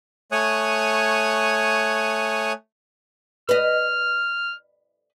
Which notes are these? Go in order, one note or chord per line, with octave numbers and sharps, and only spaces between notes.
A3 C#5 G#5 C#6 D#6 F#6
B4 D#5 F6